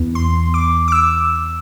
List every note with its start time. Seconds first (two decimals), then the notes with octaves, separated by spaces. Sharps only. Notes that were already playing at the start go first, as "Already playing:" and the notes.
Already playing: E2 E3 B3
0.15 C6
0.54 D6
0.88 D6
0.92 E6